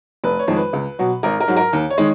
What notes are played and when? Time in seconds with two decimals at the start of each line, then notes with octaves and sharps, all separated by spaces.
0.24 F1 B4
0.39 C#5
0.48 F2 D#3 G#3
0.56 B4
0.73 C#2
0.99 B2 F#3
1.23 G#1 A#4
1.40 A#4
1.48 G#2 F#3
1.57 A#4
1.73 D#2
1.91 C#5
1.98 D#3 G#3